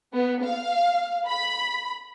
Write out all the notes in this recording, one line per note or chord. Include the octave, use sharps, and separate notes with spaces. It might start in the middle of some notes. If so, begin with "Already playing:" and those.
B3
F5
B5